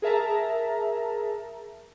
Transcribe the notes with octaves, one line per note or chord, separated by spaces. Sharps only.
G#4 A#4 E5 A5 A#5